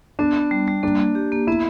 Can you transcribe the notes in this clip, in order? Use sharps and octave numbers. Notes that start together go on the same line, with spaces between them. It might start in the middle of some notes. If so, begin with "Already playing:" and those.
B3 D4
B3
G3
G3
A#3 D4
A#3
G4
A#3
B3 E4